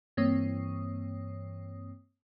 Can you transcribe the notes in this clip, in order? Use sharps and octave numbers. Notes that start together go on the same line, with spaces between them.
G2 E3 A#3 C4 C#5 D#6